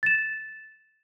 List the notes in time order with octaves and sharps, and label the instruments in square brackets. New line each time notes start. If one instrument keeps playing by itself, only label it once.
[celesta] A6 E7